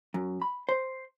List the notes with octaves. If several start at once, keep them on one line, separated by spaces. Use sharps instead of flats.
F#2
B5
C5